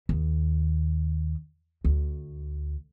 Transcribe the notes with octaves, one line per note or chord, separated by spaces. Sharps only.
D#2
D2